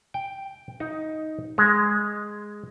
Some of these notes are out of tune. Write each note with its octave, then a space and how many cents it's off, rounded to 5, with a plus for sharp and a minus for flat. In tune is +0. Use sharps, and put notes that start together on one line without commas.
G5 +0
D#4 +10
G#3 +0